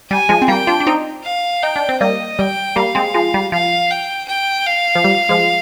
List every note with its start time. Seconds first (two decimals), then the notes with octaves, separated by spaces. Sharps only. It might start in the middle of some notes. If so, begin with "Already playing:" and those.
0.10 G3 G#5
0.29 F3 G#3
0.42 C4
0.48 G3 A#3 G5
0.67 D4 F4
0.80 D4
0.87 C4 D#4
1.24 F5
1.63 D#4 G5
1.76 D4
1.89 C4
2.01 G3 A#3 D#5
2.39 G3 G5
2.76 G3 A#3 F5
2.95 G#3 C4
3.14 F3 G#3
3.34 G3
3.52 F3 F5
3.91 G5
4.28 G5
4.67 F5
4.95 F3
5.04 G3
5.29 F3 G#3